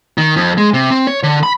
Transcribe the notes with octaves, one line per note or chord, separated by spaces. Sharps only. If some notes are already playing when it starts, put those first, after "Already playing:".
D#3
F2
G#3
C3
C4
C#5
D3
B5